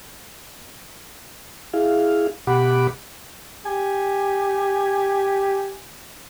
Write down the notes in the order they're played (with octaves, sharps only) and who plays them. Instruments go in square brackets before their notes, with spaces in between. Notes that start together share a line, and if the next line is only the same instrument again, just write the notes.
[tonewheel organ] E4 G#4 F5
B2 G4 F#5 B5 D6
[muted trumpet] G4 [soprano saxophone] G#5